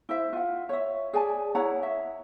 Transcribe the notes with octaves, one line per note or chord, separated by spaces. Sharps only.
E4 C5 E5
F4 F#5
C#5 E5
G#4 D5 G#5 A5
E4 C#5 F#5 A#5
E5